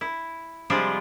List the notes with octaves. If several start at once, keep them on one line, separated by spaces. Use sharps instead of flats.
E4
C3 F3 G3 G#3 D4 F4